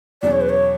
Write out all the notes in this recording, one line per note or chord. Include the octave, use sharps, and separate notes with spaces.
E2 B2 F#3 C#4 G#4 D5
C#5
B4
C#5